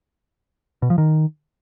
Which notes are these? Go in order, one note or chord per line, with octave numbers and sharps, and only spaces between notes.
B2
F3
D#3